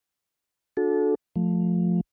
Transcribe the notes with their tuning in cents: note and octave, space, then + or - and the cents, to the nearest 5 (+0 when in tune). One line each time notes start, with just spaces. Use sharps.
D4 +0 F#4 -35 A4 -25
F3 +10 A3 +0